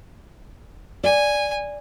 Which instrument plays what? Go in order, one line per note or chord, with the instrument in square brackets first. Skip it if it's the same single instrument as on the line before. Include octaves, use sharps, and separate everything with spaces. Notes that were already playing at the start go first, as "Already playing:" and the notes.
[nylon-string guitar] D5 [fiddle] G#5